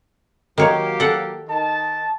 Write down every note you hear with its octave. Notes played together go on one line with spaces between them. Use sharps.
D#3 F#3 A#3 G4 C#5
A4 F#5
D#3 A5